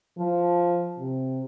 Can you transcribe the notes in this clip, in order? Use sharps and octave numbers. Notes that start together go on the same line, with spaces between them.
F3
C3